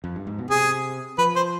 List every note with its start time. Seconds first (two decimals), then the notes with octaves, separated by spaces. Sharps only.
0.04 F2
0.16 G2
0.27 G#2
0.38 B2
0.50 C3 G#4
1.18 F3 B4
1.36 C5